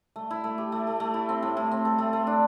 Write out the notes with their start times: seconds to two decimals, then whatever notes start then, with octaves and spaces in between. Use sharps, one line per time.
0.16 A3
0.31 E4
0.44 A3
0.58 G4
0.72 A3
0.87 A3
1.00 A3
1.14 E4
1.29 C4
1.43 A2
1.57 A2
1.71 C4
1.85 A4
1.98 A3
2.13 A3
2.27 D4